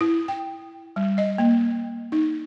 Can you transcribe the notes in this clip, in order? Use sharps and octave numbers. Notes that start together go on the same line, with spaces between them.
E4
G5
G3
D#5
A#3
D#4